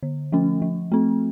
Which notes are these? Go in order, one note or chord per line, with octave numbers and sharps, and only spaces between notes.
D3
F3 A3 C#4
F3
A3 C4